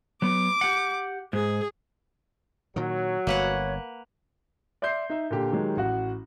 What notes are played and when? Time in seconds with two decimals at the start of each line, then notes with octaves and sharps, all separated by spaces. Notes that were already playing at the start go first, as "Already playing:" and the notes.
0.22 F#3 B3 D6
0.61 G4 F#5
1.33 G#2 G#4
2.76 A#2 D#3 F#3
3.27 G1 A#3 B4 C#5 F#5
4.82 D5 E5 C6 G6 C7
5.10 D#4 E5
5.30 A#2 D3 G4
5.52 D#3 F#3 G#3 G4
5.76 A1 F#4 F#5